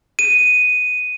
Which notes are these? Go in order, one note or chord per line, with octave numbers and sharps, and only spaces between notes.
D#7